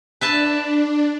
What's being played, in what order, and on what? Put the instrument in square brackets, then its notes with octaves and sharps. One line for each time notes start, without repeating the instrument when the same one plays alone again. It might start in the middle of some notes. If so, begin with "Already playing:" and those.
[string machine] D4 [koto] B4 E5 A5